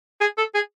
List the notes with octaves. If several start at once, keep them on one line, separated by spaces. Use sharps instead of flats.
G#4
A4
G#4